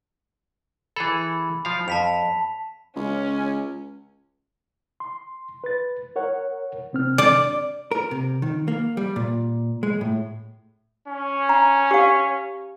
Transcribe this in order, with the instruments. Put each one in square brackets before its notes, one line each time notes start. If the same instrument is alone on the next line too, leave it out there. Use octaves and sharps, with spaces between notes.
[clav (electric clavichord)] E3 G#4 A4 [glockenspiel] B5
[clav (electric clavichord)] F3 F5
[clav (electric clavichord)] F2 [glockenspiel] A5 B6 F7
[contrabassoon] C#2 [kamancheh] C#4
[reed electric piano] C6
B4 A6
A#4 C#5 F#5
C3 C4 F6
[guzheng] D5
[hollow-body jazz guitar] A#4
C3
D#3
A#3
G3
A#2
G#3
A2
[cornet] C#4
[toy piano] A#5
G4 F5